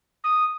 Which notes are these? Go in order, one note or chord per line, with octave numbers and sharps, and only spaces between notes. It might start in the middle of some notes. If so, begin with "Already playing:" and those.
D#6